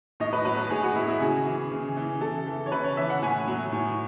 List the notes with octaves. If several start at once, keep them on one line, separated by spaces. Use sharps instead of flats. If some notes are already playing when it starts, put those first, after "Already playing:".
A2 D#5
B4
F#3 B4
B4
A2 G#4
F#4
F#3 E4
E4
C#3 G#4
E3
C#3
E3
C#3 A4
E3
C#5
C#3 B4
C#5
E3 E5
F#5
A2 G#5
F#3
A2